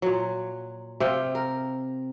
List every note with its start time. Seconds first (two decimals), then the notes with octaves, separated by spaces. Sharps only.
0.02 A#2 F#3
1.00 C3 F5 G5
1.35 A#4